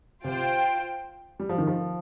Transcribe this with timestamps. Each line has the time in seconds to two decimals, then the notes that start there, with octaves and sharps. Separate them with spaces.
0.24 C3 F4 C5 G5
1.40 G3
1.49 F3
1.58 D#3
1.67 F3